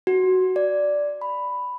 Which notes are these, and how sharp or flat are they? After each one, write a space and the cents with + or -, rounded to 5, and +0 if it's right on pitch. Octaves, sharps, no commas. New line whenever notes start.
F#4 +5
D5 -5
B5 +5